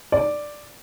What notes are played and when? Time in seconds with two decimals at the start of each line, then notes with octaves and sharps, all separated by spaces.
0.12 D5